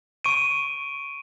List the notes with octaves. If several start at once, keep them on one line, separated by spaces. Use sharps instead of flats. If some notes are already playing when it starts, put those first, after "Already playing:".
C#6 D7 D#7